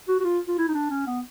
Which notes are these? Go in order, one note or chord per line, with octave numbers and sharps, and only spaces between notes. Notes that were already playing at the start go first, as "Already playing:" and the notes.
F#4
F#4
F4
F4
E4
D#4
D4
C#4
B3